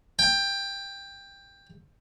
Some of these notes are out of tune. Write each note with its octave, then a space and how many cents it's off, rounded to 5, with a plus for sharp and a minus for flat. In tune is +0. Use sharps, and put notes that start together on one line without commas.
G5 +15